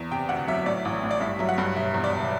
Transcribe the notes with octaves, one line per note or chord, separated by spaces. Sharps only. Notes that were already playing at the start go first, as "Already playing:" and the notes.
Already playing: E2
C3 G5
D2 F#5
F#3 E5
A2 D5
A1
A2
D5
G2 E5
F#3 E5
F#5
G2
E1 E5
E2
D5
E1